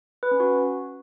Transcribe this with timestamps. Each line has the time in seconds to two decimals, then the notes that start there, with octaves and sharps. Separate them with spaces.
0.23 B4
0.31 C#4
0.40 F#4